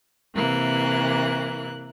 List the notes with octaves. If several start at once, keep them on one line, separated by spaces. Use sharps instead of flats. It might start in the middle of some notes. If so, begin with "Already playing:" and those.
C3 E3 A#3 F#6